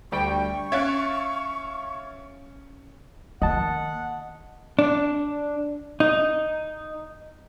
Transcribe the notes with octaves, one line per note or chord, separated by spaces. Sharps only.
D2 G3 G5 C#6
C#4 E5 F5 F#6 G#6 A6 D7
D#3 A#3 D#5 F#5 A5
D4
D#4